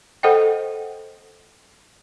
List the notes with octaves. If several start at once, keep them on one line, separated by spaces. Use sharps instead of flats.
A4 C5 D#5 F#5 G5